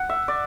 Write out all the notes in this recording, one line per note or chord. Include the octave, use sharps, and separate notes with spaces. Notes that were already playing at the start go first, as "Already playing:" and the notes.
Already playing: F#5
E5
D5